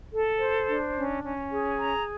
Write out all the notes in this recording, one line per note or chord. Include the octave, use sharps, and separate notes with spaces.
A4
C5
D4
C#4
C#4
G#4
A#5